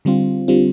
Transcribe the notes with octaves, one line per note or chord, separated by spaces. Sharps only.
D3 G3 C4 F4
D3 G3 C4 F4